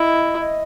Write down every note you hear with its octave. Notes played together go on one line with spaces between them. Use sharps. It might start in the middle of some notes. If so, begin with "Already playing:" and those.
Already playing: E4 D#5
D#5